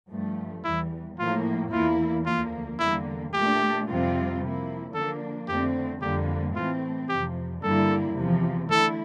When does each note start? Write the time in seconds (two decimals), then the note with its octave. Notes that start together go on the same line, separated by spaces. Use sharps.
0.11 G2 F3 A3
0.64 E2 E3 G3 E4
1.19 A2 F3 A#3 F4
1.72 E2 E3 A#3 E4 F4
2.26 D2 D3 F3 A#3 F4
2.80 E2 D3 G3 A#3 E4
3.33 A#2 A3 D4 G4
3.87 F2 C3 G3 C4 F4
4.41 C3 F3 A#3 E4
4.95 D3 F3 A#3 D4 A4
5.48 F2 D3 A3 C4 G4
6.02 F2 D3 G3 A#3 G4
6.56 A2 E3 A3 C4 F4
7.09 F2 C3 F3 G4
7.63 G2 D3 G3 A#3 E4 A4
8.17 E2 C3 F3
8.71 D3 A3 E4 A4